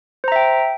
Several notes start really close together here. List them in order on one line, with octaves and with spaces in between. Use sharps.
C5 A#5 E5 G5